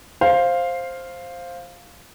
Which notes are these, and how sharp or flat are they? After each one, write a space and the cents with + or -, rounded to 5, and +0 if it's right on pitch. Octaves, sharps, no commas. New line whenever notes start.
C5 +10 F5 +0